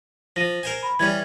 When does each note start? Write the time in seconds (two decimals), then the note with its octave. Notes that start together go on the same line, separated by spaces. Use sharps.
0.36 F3 A#6 D#7
0.63 A#4 C5 G#5
0.83 B5
1.00 E3 G3 C#4 G#6